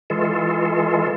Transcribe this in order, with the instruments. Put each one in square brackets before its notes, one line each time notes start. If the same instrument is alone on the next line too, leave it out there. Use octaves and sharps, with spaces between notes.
[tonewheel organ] E3 G#3 F4 A4